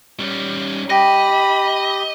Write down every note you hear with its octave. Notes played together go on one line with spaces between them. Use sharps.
G3 C#4
G4 D#5 G5 B5 A#6